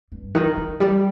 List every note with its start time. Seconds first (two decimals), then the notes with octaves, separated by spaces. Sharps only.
0.12 G2
0.35 D#3
0.57 D#3
0.80 G3